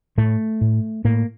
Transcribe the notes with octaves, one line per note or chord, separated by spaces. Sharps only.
A2 A3
A2
A2 A#3